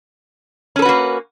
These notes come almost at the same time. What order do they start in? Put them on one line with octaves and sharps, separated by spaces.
C#4 A4 B4 F#4 A#3